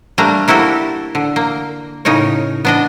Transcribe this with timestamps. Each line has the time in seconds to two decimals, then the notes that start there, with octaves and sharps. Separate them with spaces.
0.18 G3 A3 A#3 D4 A#5
0.48 A#3 E4 F#4 G4 A4
1.15 D3
1.36 A#3
2.05 A2 C#3 D#4 A#4 C#5
2.65 B3 D4 D#5